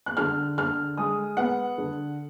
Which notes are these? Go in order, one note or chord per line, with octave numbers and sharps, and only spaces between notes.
F#6
D3 F6
D3 F6
G#3 D#6
B3 F#5
D3